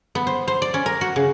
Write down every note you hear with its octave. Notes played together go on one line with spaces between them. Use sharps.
B3
C5
C5
D5
C#4
A#4
F#4
C#3